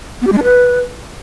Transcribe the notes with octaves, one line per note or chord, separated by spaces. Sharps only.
B3
G4
G#3
D4
B4